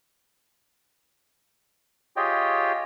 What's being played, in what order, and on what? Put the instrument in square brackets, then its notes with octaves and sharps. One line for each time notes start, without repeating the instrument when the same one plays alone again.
[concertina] F4 G4 G#4 C#5 D#5 G5